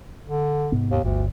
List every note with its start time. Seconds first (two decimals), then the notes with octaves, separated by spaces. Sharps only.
0.25 D3
0.72 G#2 C3 B3
0.91 D#2
1.04 G1 D2